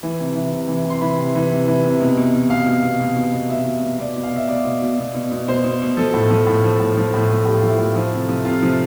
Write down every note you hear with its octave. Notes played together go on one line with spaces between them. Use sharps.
E3
C3
E3
C3
E3
C3
C6
E3 B5
C3
E3
C3
E3
C3
B2
B2
B2
B2 F5
B2
B2
B2
B2
B2
B2 E5
B2
B2
B2 D5
B2
F5
B2 E5
B2 D5
B2
B2
B2
B2
B2
B2 C5
B2
B2
F3 A4
A2
F3
A2
F3
A2
F3
A2
F3
A2 G4
F4
F3 E4
A2 F4
F3
C3
F3
C3 F4
F3